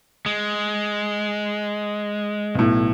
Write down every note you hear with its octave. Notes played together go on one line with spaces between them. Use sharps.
G#3
B1 A2